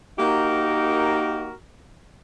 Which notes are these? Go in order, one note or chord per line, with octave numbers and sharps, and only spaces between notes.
A#3 D#4 F#4 G4 A#4